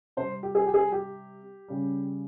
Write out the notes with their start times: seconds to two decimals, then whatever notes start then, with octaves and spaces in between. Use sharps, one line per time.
0.17 C3 G3 C5
0.43 G4
0.55 G#4
0.66 G4
0.74 G#4
0.92 G4
1.68 C#3 G3